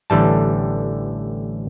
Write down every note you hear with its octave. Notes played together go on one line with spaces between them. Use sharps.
A1 D3 E3 G3 A5